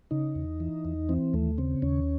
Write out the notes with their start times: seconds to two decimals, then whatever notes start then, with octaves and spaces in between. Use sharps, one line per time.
0.11 C#3 D#4
0.35 E2
0.60 E3
0.85 E2
1.09 E3 C4
1.33 D#2 A3
1.58 C#3 C4
1.82 D#2 C#4